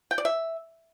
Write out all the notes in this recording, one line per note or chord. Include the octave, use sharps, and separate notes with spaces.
G5
D5
E5